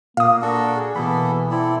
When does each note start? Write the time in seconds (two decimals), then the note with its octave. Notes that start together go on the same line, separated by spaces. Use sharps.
0.17 A#2 A#3 F5 D#6
0.42 D4 F#4 A4 A#4
0.73 G#4
0.96 B2 E3 A#3 B3 A4 B5
1.51 C4 E4 A4 D5